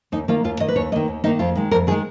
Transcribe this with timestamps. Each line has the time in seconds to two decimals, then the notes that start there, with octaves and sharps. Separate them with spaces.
0.12 D#2 D#4
0.28 D#3 A#3 F4
0.44 D#2 F4
0.60 D#3 A#3 D#5
0.68 B4
0.76 D#2 C#5
0.92 D#3 A#3 D#5
1.08 D#2
1.24 D#3 A#3 D#4
1.39 F2 F4
1.55 D#3 G#3
1.71 F2 A#4
1.87 D#3 G#4
1.91 G#3